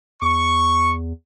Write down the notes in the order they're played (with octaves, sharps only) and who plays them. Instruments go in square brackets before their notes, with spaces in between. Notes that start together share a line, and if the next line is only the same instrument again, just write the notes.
[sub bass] E2 [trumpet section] C#6